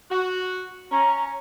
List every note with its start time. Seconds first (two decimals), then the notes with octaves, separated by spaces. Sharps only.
0.11 F#4
0.92 C#4 A#5